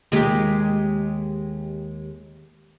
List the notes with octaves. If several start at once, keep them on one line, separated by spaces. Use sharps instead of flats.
D#2 G#3 G4